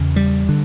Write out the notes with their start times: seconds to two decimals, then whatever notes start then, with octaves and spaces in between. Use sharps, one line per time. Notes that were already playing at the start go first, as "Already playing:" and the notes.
Already playing: E2 C#3
0.16 G3
0.49 D3